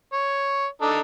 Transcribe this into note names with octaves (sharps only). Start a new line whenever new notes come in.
C#5
D4 D#4 A4